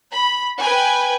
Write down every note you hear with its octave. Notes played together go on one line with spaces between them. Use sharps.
B5
B4 G5 G#5